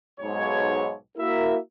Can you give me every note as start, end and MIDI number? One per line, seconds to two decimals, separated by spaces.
0.20 0.94 35
0.20 0.94 44
0.20 0.94 73
1.17 1.56 58
1.17 1.56 64
1.17 1.56 66
1.17 1.56 70
1.17 1.56 76